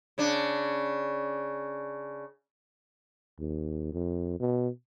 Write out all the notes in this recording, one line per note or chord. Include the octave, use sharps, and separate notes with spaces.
C#3 D4
D#2
F2
B2